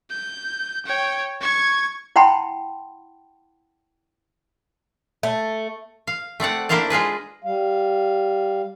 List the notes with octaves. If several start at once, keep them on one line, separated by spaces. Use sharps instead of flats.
G6
C#5 G5
C#6 G#6
E4 F#5 G5 A5 B5 C6
A3
F5
A3 C4 D5 F#5
A#3 D4 E4 C5 F5 A5
G#3 F4 G#4 B4
G3 F5